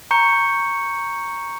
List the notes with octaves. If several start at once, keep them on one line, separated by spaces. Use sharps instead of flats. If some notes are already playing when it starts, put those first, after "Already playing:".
A#5 C#6 G6 C#7